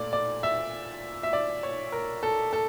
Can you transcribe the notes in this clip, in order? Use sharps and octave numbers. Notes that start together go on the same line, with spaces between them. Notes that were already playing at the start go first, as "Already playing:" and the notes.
Already playing: A#2 A3 D5
D5
E5
E5
D5
C#5
A#4
A4
A4